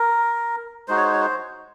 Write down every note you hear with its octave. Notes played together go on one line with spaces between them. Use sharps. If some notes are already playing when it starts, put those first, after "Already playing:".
Already playing: A#4
G#3 D#4 F#4 C5
C#5
C5
C#5
C5